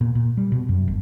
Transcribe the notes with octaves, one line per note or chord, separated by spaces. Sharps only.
A#2
A#2
G3
B2
F#2
G1